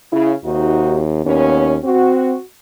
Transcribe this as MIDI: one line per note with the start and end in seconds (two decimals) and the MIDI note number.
0.12 0.32 49
0.12 0.33 64
0.45 1.23 39
0.45 1.01 48
0.45 1.01 63
0.45 1.01 66
1.25 1.76 39
1.25 1.76 46
1.25 1.76 59
1.25 1.76 61
1.84 2.35 60
1.84 2.42 66